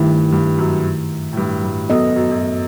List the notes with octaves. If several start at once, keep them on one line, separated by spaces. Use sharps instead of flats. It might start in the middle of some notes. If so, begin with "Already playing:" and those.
Already playing: G2 D#3 A3 E4 G4
G2
F#2
A2
G2
G2
F#2 B3 F#4 A4 D#5
F#2
F#2